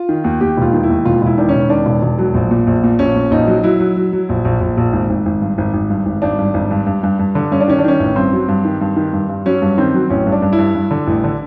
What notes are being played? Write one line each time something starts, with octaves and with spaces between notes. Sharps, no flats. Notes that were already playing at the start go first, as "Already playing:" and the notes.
Already playing: F4
D#3
D#2
D#2 G4
E1 F4
D#3
E4
D#2
E1 F4
E1 E4
D#3 D4
C#4
E1
D#3 D4
E1
E1
F#3
A#1
A#2
A#1
A#2
A#1 C#4
A#2
A#1 D#4
F#3
F#3 E4
F#3
F#3
F#3
A#1
A#1
A#1
A#1
G#1
G#1
G#1
G2
G#1
G#1
G2
G#1
G#1 D4
G2
G#1
G2
G2
G2
G2
D3
G2 C#4
D4
D#3 C#4
D4
D#3 C#4
A1
G2 C4
F#3
G2
D#3
G2
D#3
G2
G2
F#3 C#4
G2
D#3 C4
F#3
A1 C#4
G2
D4
G2
E4
G2
G2
D3
A1
D3